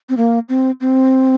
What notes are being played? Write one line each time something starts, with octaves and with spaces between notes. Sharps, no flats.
C4
A#3
C4
C4